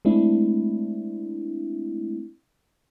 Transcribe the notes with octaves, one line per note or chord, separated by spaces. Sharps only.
G#3 A3 C4 D4 E4